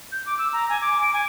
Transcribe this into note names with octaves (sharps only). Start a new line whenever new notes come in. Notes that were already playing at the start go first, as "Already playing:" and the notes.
G6
D6
E6
A#5
G#5
D6
D7
G#5